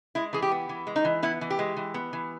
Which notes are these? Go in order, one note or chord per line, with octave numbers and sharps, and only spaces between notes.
G#3 E4
E3 G#4
G4
B3
E3
G#3
D#4
E3
B3 E4
E3
G4
G#3
E3
B3
E3